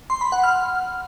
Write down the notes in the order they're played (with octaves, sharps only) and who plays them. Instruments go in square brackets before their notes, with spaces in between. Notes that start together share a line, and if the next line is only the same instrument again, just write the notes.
[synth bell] C6
B5
F#5
F6